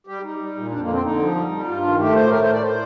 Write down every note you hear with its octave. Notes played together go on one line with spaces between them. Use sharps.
G3 G4
G3 D#4
G3
A#2
F2 D4
C4
A#3
D3 C4
D3 D#4
F3
G3
G3
G2 F4
D#3
A3 G4
A2 C5
A3 A#4
C5
A2
D5
C5